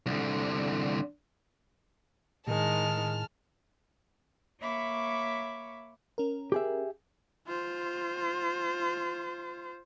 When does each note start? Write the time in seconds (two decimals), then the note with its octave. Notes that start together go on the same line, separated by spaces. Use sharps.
0.06 C2 D3
2.48 A2 D#3 G#3 A5 F6
4.61 A#3 C#5 E5 B5 C#6 D6
6.18 C#4 A#4
6.52 G4 G#4 E5
7.47 F4 C5